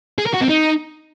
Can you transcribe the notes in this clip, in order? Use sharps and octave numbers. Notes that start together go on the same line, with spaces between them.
G#4
A#4
F#4
C4
D#4